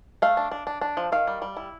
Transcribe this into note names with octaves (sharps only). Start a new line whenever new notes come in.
A3 F5
D4
D4
D4
D4
F3
D#3 F5
G3
G3
E4